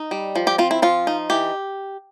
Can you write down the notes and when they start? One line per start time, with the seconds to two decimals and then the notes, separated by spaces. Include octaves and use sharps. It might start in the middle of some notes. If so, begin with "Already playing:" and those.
Already playing: D#4
0.11 G3
0.36 F3
0.47 G4
0.58 C4 F4
0.71 E4
0.82 F3 F4
1.07 D#4
1.30 E3 G4